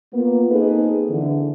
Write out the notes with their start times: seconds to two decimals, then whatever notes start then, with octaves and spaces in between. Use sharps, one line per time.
0.14 A#3 B3 F4
0.51 A#3 C4 D#4 G#4 A4 B4
1.10 D3 E3